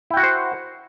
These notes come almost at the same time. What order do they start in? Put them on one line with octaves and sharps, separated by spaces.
E4 G5 F#4 F#5 C5